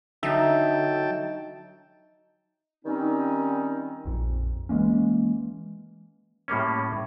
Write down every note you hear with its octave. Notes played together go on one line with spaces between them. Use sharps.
D3 F#3 D#4 E5 G5 A5
D#3 G3 C4 C#4 D#4
A#1 F2
E3 G#3 A#3 C#4
A2 G3 A#3 C#4